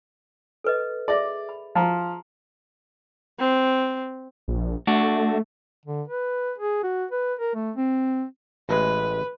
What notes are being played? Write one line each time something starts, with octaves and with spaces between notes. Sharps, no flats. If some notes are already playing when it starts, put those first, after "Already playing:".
A4 B4 D#5
G#4 D5 E5
B5
F3 F5 A#5 C6
C4
A#1
A3 D4 F#4
D3
B4
G#4
F#4
B4
A#4
A3
C4
A1 G#3 B4